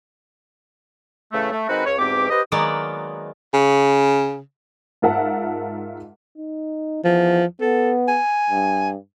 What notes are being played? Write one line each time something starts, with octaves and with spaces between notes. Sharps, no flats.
A2 C#3 E3 A3
A3
D#3 G#3 C4 D#4 F#4 B4
C#2 C#5
E2 G#2 B2 C4 G4 D6
G4 B4 C5 D#5
D#3 F#3 G#3 A#3 B3 D5
C#3
G#2 F4 A#4 E5 F#5 A5
D#4
E2 F3
B3 A4
G#5
G2